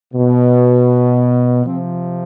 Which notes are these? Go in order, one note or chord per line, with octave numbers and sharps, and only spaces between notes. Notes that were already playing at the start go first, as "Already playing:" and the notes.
B2
C3 F3 C4